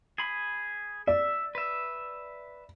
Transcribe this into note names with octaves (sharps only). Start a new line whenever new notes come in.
G#4 B5
D5 E5
B4 E5